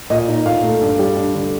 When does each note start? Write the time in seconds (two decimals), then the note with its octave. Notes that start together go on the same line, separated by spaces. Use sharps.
0.10 A#2 D#5
0.28 D#4
0.46 A#2 F5
0.63 A3
0.81 G2
0.99 G3
1.16 D4
1.34 D3